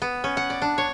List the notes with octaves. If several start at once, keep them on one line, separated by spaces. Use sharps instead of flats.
B3
C#4
F#5
D5
D4
C#5